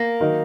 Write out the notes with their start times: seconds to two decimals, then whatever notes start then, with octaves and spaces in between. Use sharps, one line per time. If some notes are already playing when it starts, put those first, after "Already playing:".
Already playing: A#3
0.20 D#3 F#3 D#4 A#4 D#5